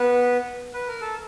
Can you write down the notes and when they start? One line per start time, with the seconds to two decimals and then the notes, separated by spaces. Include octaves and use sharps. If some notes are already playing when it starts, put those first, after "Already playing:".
Already playing: B3 B4
0.74 B4
0.87 A#4
1.01 A4